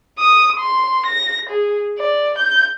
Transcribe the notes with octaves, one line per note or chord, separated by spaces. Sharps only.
D#6
C6
A#6
G#4
D5
G6